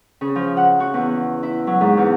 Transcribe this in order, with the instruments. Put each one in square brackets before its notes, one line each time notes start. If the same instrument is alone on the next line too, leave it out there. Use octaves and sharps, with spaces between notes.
[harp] C#3
F3
F#5
F#4
E2
E4
F#3
G#2
E2